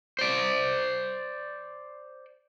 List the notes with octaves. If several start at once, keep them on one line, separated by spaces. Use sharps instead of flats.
C5 D5